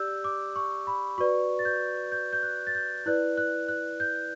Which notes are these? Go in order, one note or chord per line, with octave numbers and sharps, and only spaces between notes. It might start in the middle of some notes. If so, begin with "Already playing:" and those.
Already playing: G4 D5 E6 G6
D6
C#6
B5
F#4 B4 D5 C#6
A6
G6
G6
G6
F#6
A6
G6
E4 B4 D5 F#6
F#6
F#6
G6